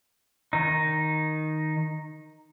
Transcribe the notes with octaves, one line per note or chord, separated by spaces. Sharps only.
D#3 D#4